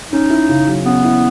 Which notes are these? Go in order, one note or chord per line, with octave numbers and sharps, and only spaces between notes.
C#4 D#4
E4
C#3
F#3
B3 C#4
E4